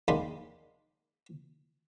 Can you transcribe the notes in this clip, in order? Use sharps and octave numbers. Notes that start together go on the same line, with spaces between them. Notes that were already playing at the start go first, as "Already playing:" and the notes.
D#3 G#3 A#3 D5 B5 C6